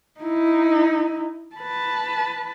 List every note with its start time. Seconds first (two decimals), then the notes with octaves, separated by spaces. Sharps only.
0.20 D#4 E4
1.56 B4 A5